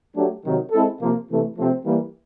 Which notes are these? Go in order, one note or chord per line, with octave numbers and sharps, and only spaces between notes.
F#3 A3 D4 G4
C3 D#3 F#3
G#3 C4 E4 A4
C3 F3 A#3
C3 E3 A3
C3 F3 A3 C4
E3 G3 A#3